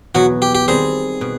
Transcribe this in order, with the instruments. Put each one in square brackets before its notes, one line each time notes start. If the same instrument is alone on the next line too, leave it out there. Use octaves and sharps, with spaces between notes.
[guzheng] E2 B2 F#3 [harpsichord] F#4
[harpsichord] G4
G4
[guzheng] D#3 G3 C4 [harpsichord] G#4
[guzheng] B2